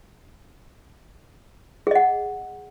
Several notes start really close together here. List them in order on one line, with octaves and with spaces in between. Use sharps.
G#4 D#5 F#5